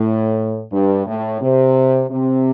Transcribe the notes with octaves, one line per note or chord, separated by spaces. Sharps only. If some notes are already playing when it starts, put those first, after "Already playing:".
Already playing: A2
G2
A2
C3
C3